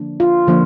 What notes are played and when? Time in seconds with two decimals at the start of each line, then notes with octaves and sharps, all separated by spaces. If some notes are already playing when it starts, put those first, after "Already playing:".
Already playing: D3 F3 A#3 D4
0.20 F4
0.47 D3 F3 A#3 D4